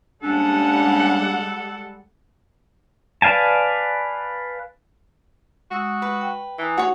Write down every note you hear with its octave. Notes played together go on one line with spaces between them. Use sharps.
D#2 G3 G#3 C#4 D4 A4 F#5
B4 D5 F5 G#5 A5
G#3 F#4 D#6 E6
B4
G5
E3 G#5 A#5 D#6
D#4 F#4 C#5